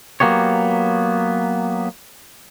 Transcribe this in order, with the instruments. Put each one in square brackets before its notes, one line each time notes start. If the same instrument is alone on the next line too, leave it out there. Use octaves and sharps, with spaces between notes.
[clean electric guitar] F#3 A#3 B3 G4 C#5